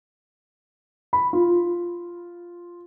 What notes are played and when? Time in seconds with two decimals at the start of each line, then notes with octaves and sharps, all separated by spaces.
1.13 B5
1.33 F4